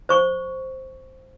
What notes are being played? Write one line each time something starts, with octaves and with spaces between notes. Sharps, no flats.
C5 C#6